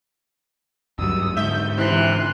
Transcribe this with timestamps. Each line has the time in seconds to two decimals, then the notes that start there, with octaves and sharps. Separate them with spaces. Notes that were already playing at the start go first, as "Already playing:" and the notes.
0.99 D2 G2 F#3 D#6 E6
1.37 G#2 D3 E5 G6
1.78 C3 E3 E4 C6 F#6